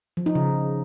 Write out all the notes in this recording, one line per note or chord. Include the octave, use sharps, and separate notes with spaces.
F3
D#4
C#3